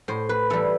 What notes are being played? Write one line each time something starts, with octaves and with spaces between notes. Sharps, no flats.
A2 C5
B4
E3 G3 A4